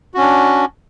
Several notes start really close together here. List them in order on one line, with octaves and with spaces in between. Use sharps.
F#4 C#4 D4